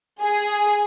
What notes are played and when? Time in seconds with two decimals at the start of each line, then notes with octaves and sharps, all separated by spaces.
0.20 G#4